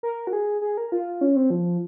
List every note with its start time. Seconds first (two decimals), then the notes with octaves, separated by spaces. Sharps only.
0.03 A#4
0.27 F#4
0.33 G#4
0.62 G#4
0.77 A#4
0.92 F4
1.21 C#4
1.36 C4
1.50 F3